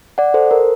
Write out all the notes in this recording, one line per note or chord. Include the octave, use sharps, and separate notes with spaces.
D5 F#5
A4 C5
A#4